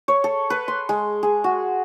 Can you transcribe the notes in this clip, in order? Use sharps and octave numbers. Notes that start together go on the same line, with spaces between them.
C#5
A4
B4
C6
G#3
G#4
F#4